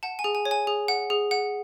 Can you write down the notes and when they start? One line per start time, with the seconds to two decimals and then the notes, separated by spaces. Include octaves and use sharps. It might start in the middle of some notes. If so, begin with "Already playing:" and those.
0.03 F#5 A5
0.19 G#5
0.24 G#4
0.35 G#5
0.45 C#5
0.51 G#5
0.67 G#4
0.88 F#5
1.10 G#4
1.31 F#5